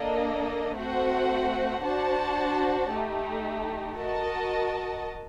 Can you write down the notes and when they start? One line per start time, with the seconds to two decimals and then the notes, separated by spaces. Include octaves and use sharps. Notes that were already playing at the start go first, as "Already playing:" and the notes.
Already playing: A#3 D4 A4 D#5
0.76 A3 C4 F#4 C5 F#5
1.84 D4 F#4 C5 F#5 A5
2.92 A3 D#4 G4
3.99 F#4 A#4 D#5 A5